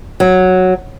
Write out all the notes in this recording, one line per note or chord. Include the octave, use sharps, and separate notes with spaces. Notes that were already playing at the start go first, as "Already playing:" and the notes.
F#3